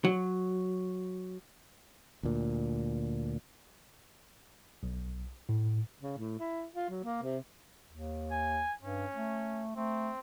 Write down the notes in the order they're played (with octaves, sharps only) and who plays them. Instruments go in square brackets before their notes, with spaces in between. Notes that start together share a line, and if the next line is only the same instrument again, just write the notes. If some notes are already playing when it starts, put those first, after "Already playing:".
[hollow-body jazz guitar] F#3
[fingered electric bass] D2 A#2
[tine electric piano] B1
A2
[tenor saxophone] C#3
A2
E4
F4
F#3
A#3
C3
[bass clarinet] D#2
[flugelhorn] G#5
[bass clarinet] G2 [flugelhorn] C#4
[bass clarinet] A3
[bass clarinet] A3 [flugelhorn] C4